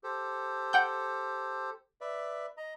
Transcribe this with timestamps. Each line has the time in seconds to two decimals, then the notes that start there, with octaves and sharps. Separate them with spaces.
0.03 G4 A4 C5
0.73 F#5 G5 G6
2.01 B4 D5 E5
2.57 D#5 A#5